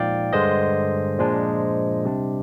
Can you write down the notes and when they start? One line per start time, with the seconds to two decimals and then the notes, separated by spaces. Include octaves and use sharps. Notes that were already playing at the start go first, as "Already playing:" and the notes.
Already playing: A#2 F3 G#3 D#4 D5 F5 G5
0.33 G2 D3 G#3 C5 D#5
1.19 A#2 F3 G#3 D4
2.05 C3 G3 D4